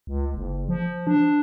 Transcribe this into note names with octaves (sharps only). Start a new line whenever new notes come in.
C#2
F#1
F3
D4